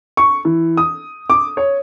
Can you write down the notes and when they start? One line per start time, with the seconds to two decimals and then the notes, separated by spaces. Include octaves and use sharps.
0.17 C#6
0.45 E3
0.77 D#6
1.30 D6
1.57 C#5